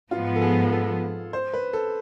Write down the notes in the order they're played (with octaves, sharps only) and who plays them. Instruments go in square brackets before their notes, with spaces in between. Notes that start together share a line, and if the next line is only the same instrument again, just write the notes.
[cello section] G#2 F3 B3 [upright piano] F4
[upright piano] A4
G#4
A4
C5
B4
A4